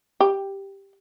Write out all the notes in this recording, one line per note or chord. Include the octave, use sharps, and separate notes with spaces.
G4